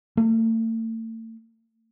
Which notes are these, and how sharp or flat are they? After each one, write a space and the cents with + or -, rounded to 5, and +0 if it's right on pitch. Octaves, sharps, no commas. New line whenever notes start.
A3 +40